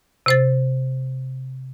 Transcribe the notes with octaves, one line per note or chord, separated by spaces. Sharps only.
C3 C5 A6